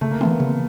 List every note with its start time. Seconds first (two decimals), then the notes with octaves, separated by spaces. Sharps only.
0.01 C#3 A3
0.11 A#3
0.21 E3 A3 B3 C4
0.31 A#3
0.40 C#3